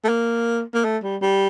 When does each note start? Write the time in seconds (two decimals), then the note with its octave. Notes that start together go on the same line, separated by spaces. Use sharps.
0.04 A3
0.09 A#3
0.74 A#3
0.84 A3
1.03 G3
1.22 G3